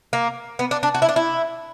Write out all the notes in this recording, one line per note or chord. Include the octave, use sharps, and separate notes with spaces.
A#3
B3
D4
D4
F#4
E4
D4
E4